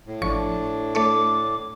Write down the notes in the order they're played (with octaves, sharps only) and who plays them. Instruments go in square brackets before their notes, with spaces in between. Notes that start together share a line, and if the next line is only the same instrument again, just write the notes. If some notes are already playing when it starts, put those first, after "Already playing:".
[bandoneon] A2
[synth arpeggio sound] G#1 F3 C#6 [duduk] D4
[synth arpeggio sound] A3 A4 C#5 [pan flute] D6